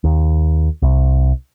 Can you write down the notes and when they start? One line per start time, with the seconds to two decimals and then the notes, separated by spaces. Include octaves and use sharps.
0.04 D#2
0.82 C2